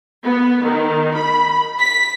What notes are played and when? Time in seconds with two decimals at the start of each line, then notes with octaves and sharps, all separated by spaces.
0.25 B3
0.65 D#3
1.15 B5
1.79 B6